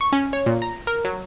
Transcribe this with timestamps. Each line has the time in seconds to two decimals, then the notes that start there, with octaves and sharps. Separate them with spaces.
0.01 C#6
0.12 C#4
0.33 C#5
0.46 A#2
0.62 A#5
0.87 A#4
1.05 F#3